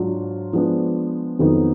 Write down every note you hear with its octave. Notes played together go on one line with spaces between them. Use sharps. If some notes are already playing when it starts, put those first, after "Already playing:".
Already playing: G#2 F#3 D4 F4
F3 G#3 B3 D4
F2 D#3 F#3 B3 D#4